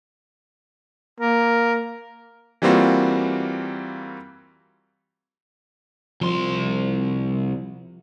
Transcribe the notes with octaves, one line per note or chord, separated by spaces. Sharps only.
A#3 A#4
E3 G3 A#3 C4 F4 F#4
C2 F3 C6